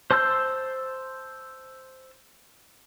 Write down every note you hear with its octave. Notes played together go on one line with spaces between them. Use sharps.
C5 A5 C6 E6 G6